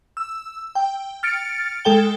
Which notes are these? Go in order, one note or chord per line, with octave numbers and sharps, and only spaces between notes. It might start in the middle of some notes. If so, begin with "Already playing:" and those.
E6
G5
F6 A6 C#7 D7
G#3 A4 G5 G7